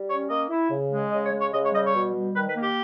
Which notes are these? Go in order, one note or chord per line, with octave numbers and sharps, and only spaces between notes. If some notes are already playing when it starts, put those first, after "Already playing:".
Already playing: G3
C#4 C#5
A#3 D#5
E4
C#3
G#3
C#3 D#5
C#5
G#3
C#5
C#3 D#5
C#5
G3 D#5
C#5
B2
G3
D#3 B4
B4
A#3
G4